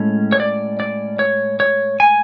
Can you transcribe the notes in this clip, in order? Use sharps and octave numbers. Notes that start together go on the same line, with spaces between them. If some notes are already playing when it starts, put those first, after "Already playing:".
Already playing: A2 G#3 C#4
C#5
D5
D5
C#5
C#5
G#5